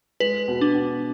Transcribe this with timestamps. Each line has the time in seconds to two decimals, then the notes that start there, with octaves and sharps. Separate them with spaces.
0.20 G#3 B4
0.48 B2
0.61 D4
0.75 B2